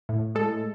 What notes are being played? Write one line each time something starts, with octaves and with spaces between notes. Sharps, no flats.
A2
G#3 A4